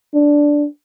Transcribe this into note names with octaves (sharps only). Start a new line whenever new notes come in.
D4